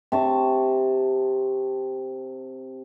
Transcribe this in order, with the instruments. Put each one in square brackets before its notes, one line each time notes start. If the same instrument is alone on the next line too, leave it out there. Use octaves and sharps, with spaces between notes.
[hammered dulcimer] C3 A5 C#6